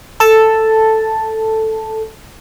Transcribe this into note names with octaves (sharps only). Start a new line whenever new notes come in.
A4 A5